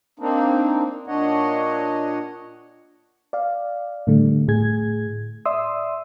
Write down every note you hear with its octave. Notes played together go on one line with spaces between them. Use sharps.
A#3 C4 D4 D#4
A#2 D4 C#5 D#5 F#5
D5 F5
A2 D3 G3 A3
A2 G#4 G#6
D5 E5 C6 D#6 E6